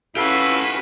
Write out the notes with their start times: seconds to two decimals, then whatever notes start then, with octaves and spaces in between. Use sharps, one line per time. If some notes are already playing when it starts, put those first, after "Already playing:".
0.17 C#4 E4 G4 A4 B4 F5 F#5